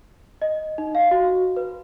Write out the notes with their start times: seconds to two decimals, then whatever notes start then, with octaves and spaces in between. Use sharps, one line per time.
0.42 D#5
0.78 D#4
0.95 F5
1.11 F#4
1.56 B4